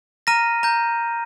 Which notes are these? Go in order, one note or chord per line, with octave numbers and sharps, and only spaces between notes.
A#5 F6 A#6 D#7
A#5 G6